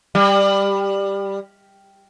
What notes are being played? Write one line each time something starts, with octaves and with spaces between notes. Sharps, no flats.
G3